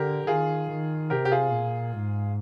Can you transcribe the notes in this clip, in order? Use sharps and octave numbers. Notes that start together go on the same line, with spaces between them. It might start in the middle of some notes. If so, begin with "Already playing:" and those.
Already playing: D3 G4 A#4
D#3 F4 G#4
D#3
C3 G4 A#4
G4
F4 G#4
A#2
G#2